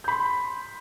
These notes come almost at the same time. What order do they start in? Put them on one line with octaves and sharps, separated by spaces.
G6 B5 C6